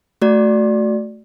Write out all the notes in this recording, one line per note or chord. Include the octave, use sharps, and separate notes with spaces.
A3 F#4 D5